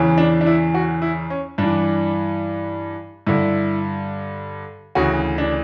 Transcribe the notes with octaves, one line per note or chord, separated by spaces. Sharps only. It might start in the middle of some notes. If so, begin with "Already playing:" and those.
Already playing: E2 C#3 E3
D4
D4
E4
F#4
E4
C#4
G2 E3 D4
G2 D3 E4
D2 C#3 E3 F#4
D4